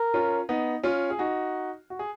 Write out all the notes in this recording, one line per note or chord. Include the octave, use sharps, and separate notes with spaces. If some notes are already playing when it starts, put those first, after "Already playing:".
Already playing: A#4
C#4 F4
B3 D#4
C#4 F4
G#4
D#4 F#4
F#4
G#4